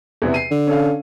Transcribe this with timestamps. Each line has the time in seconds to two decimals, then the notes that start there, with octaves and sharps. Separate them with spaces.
0.22 E2 C3 E3
0.34 C7 D#7
0.51 D3
0.67 C#4 A4 F5